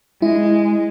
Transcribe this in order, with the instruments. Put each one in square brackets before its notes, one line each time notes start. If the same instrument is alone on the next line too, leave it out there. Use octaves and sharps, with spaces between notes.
[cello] G#3 [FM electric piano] E4